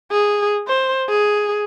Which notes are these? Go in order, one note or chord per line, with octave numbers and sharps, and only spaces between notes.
G#4
C5
G#4